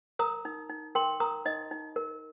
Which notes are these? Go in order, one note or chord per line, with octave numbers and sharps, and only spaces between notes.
A#4 A#5 D#6
D#4
D#4
A#4 G5 C6
A#4 A#5 D#6
D#4 D#5
D#4
A#4